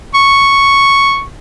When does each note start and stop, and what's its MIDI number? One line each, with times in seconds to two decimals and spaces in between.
0.14 1.23 85